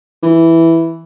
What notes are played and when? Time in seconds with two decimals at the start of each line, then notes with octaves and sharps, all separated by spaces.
0.23 E3